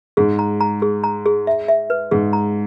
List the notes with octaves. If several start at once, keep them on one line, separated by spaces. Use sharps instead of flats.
G#2 G#4
A#5
A#5
G#4
A#5
G#4
E5
E5
B4
G#2 G#4
A#5